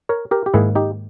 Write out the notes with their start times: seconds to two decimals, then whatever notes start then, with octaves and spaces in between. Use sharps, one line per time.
0.09 A#4 C#5
0.31 G4 A#4
0.46 G4
0.54 G#2 D#3 A#3 E4 G#4
0.75 D#4 G4